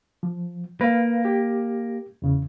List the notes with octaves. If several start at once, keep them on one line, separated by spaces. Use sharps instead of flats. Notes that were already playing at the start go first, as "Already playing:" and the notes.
F3
A#3 B4 F5
G4
E2 C#3